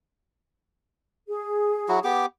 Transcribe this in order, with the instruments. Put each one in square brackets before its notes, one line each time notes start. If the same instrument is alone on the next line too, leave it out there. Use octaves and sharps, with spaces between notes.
[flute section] G#4
[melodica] F#3 E4 F#4
B3 G4 D6